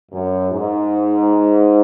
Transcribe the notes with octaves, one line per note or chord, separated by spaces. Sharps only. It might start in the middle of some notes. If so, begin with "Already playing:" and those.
F#2
G#2